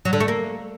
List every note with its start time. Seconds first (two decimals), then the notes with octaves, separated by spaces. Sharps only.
0.05 F#3
0.13 D3
0.20 A3
0.28 A#3